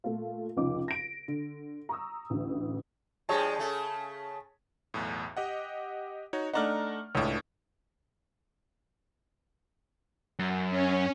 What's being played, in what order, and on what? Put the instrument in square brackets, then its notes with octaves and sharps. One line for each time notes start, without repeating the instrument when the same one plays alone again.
[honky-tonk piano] A#2 A3 F4
F1 C#2 F3 C#4 D#4 D6
A#6 D7
D3
A#5 C#6 D#6 E6
A1 D2
[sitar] G2 F3 G#3 [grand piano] G#4 C#5 A5
[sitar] C#3 A3 A4
[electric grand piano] B1 E2 A2
G4 D#5 F#5
D#4 F#4 C#5
[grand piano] A3 D4 D#4 [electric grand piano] F#5 A#5 F6
[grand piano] C#2 [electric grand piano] A2 D4 C#5
[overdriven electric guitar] F#2
[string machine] C#4